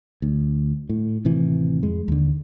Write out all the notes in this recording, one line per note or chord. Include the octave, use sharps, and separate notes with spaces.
D2
A2
A1 C3 D#3 E3
F2 G#3
D#2 D3